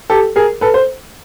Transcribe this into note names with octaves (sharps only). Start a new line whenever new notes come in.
G4 A4
G#4 A#4
A4 B4
C5